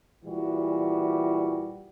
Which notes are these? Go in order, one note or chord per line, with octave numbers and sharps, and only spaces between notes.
A#2 E3 G3 F#4